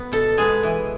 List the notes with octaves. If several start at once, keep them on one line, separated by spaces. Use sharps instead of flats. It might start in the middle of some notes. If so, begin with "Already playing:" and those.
Already playing: B3
B2 A4
G#3 B3 G#4
E3